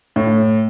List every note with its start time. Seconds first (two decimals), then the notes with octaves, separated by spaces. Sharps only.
0.16 A2